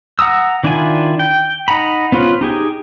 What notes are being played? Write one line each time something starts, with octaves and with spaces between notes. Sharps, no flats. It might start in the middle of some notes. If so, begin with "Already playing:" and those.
F#5 A#5 D#6 E6
D#3 D4 E4 F4 G#5
G5
D#4 F#5 A#5 B5
B3 C#4 F4 B4 C5
D#4 G4 G#4